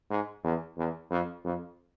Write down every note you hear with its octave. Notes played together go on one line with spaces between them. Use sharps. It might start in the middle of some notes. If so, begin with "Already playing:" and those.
G#2
E2
E2
F2
F2